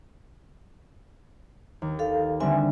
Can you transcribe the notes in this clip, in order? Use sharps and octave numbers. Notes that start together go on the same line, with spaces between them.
D#2
A4 F5
D3 G3 C4 E5 G#5